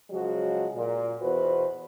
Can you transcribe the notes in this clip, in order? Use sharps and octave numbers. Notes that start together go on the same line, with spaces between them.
C#3 F3 F#3 G#3 F#4
A#2
E2 B2 F#4 B4 C5